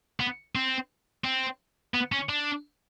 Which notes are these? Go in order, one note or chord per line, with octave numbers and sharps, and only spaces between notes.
B3
C4
C4
B3
C#4
D4